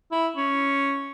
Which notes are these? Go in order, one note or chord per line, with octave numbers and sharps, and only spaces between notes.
E4
C#4